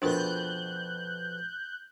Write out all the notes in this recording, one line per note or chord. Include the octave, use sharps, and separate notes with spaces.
F2 B2 D4 F4 A#4 F#6 G6